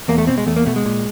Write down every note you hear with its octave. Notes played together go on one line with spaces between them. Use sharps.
E2 A#3
A3
B2 C4
G#3
E2 A3
A#3
B2 A3
G#3
A#2